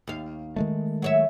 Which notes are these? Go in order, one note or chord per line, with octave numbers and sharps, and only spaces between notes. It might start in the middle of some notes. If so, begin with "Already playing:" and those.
D#2 F5
D#3 G#3 A3
F#3 C#5 E5